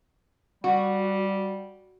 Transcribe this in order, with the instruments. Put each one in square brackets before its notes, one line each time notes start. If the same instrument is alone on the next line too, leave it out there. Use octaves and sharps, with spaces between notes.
[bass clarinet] G3 [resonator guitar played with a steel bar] F#4